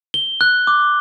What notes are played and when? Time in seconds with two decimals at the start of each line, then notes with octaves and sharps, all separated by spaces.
0.14 G7
0.41 F#6
0.67 D6